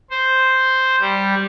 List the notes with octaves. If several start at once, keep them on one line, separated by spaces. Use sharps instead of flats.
C5
G3